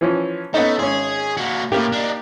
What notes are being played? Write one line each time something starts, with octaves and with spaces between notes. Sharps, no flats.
E3 F3 C#4
A3 B3 C#4 D#4
G#1 C#4 G#4
A#3 F#4
A2 A#3 G4
D4 D#4